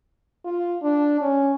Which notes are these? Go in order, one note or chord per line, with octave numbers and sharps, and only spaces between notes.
F4
D4
C#4